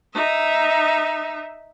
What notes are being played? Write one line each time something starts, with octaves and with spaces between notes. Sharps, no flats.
D#4 E5